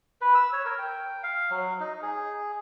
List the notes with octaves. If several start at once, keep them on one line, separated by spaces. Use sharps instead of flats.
B4
E6
C#5
A#4
G5
F5
F#3
D#4
G#4